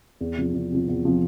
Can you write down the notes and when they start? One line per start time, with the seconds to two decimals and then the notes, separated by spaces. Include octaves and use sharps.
0.21 E2
0.37 C3 F3
0.54 E2
0.71 C3 F3
0.88 E2
1.05 C3 F3